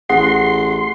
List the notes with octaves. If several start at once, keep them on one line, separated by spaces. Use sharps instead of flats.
A1 G#4 F#5 C6